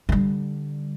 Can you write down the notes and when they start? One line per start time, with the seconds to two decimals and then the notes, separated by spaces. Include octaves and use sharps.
0.09 D3 G3